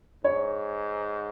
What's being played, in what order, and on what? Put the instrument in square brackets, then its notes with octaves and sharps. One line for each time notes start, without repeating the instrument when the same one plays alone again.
[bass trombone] G#2 [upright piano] C#5